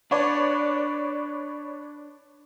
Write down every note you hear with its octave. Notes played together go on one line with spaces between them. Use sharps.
D4 B4 C#5 D5